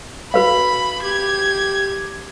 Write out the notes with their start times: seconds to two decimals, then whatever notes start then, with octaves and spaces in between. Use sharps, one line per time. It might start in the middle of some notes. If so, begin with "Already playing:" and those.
0.34 F#4 B4 F5 B5
1.03 G4 G#6